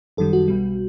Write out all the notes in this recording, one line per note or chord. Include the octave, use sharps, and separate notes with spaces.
G1 F#2 D#3 G3 A4
F#4
B1 B2 G3